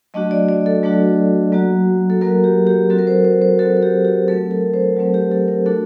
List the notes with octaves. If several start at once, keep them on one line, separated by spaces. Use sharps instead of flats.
F#3 A3 D4 F#4 D#5
D5
D5
A4
F#3 A3 D4 F#4
F#3 A#3 F#4
A4
F#3 A#3 F#4 A#4
G4
G4
F#3 C4 F#4 A4
A#4
C5
C5
C5
F#3 C4 F#4 A4
A4
G4
G4
F#3 A3 C4 A4
A#4
C5
F#3 A3 C4
G4
A4
A#4
A3 D4 F#4 A4